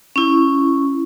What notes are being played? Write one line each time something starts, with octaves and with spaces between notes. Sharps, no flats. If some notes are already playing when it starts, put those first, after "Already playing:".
C#4 E4